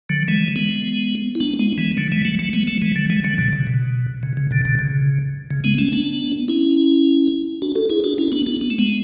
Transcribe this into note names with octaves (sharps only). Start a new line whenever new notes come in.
D3 F#3
E3 G#3
G#3 B3
E4
B3 D4
G#3 B3
E3 G#3
D3 F#3
E3 G#3
F#3 A3
F#3 A3
G#3 B3
F#3 A3
E3 G#3
D3 F#3
E3 G#3
D3 F#3
B2 D3
C#3
B2
C#3
C#3
B2 D3
B2 D3
C#3
C#3
G#3 B3
A3 C#4
B3 D4
C#4 E4
D4 F#4
F#4 A4
E4 G#4
D4 F#4
C#4 E4
B3 D4
B3 D4
B3
A3
G#3 B3